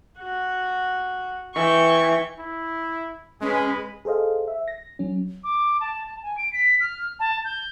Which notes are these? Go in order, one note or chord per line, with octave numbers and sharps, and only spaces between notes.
F#4
E3 G5 C#6
E4
G#3 C#4 G#4 B4
G#4 A4 C5 D#5 F5
E5
A#6
F#3 C#4
D6
A5
A5
G#5
D7
B6
F6
A5
G6